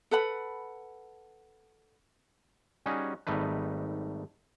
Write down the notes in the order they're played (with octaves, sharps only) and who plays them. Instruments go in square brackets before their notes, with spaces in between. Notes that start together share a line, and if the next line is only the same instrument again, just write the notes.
[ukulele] A4 B4 F#5 B5
[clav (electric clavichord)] G3 C#4 D#4 F#4 G#4
G#1 G3 A3 D#4 B4